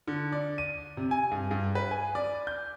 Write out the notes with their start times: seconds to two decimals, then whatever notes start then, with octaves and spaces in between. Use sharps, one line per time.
0.07 D3
0.32 D5
0.58 D#7
0.97 C3
1.11 G#5
1.31 G2
1.51 G2
1.75 B4
1.91 G#5
2.15 D5
2.47 G6